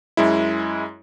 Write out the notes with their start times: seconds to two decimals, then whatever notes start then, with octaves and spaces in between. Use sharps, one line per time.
0.17 F#2 G#3 E4